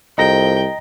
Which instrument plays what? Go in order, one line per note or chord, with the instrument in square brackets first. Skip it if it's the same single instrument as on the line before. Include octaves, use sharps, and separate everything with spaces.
[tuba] C2 [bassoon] F2 [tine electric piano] D#5 A#5 A#6 [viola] G5